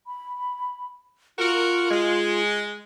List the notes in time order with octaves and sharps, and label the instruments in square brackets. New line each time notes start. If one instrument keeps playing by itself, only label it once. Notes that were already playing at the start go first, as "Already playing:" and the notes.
[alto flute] B5
[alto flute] F4 [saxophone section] F#4 A#4
[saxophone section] G#3